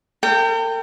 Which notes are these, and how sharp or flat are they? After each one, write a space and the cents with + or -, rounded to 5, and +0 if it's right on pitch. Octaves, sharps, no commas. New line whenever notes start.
A#4 -45 G5 +0